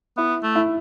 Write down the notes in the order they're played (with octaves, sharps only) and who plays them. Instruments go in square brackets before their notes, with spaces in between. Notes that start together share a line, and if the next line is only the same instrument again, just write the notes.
[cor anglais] B3 [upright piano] E4
[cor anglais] A3
[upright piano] E4